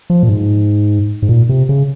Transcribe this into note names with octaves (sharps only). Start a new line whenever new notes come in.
F3
A#2
G#2
G#2
A#2
C3
C#3